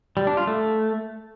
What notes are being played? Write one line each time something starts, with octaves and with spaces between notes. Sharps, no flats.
G3
D4
F4
A3